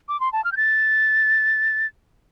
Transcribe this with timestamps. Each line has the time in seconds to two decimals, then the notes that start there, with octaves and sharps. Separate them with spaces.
0.08 D6
0.20 C6
0.33 A5
0.44 F6
0.52 G6
0.57 A6